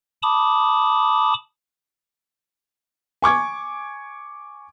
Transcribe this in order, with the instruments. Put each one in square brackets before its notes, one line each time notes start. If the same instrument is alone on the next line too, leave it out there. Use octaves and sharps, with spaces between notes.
[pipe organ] A5 B5 D6 D#6
[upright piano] G#5 C#6 D6 G#6